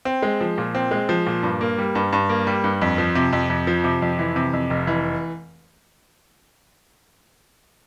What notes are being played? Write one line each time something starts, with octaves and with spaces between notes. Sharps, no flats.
C4
G#3
F3
A#2
C4
G#3
F3
A#2
G2
A#3
G3
G2
G2
A#3
G3
G2
F2
F3
C3
F2
F2
F3
C3
F2
E3
C3
F2
F1
E3